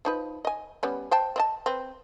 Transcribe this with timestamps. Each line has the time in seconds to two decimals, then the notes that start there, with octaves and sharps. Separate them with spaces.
0.05 F3 D#4 B4
0.45 D#5 G#5
0.83 G3 B3 C#4
1.11 C5 G5 A5
1.36 C4 D#5 A5
1.66 C4 B4